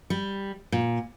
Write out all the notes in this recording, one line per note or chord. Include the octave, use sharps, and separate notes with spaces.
G3
A#2